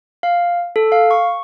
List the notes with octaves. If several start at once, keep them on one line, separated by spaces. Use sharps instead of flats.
F5
A4
F5
C#6